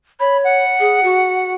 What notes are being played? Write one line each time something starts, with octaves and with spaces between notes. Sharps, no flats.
C#5 B5
F#5
G#4
F#4